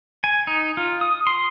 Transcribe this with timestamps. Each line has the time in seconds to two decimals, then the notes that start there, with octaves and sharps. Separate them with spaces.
0.24 G#5
0.47 D#4
0.77 F4
1.01 D#6
1.27 C6